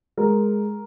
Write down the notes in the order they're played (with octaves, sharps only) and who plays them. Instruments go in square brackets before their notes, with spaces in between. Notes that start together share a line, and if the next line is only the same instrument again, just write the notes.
[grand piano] G#3 A#4